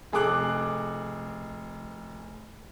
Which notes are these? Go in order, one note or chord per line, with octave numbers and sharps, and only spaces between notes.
F1 G#4 A4 D6 F#6 F#7